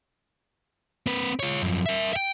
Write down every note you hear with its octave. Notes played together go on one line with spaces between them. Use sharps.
C4 B4
F4 C#5
F#2 F3
A#4 E5
E5 G5